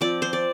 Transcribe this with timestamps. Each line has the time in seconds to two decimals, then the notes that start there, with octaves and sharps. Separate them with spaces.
0.01 F3 C4 D5
0.22 C5
0.33 D5